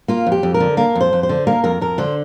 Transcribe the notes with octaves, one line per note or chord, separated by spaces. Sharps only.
A#3 F4
F2
G4
F2
A#4
D3
A#3 A#4
F2
C5
F2
C5
D3
A#3 A#4
F2 A#4
F2 A#4
D3 C5